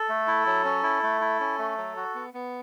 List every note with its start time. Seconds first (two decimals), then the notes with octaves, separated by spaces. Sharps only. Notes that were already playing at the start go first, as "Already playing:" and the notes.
Already playing: A4
0.09 A3
0.27 E4
0.46 F#3
0.65 C#4
0.83 E4
1.03 A3
1.21 E4
1.40 C#4
1.58 A3
1.77 F#3
1.96 F#4
2.15 B3
2.34 B3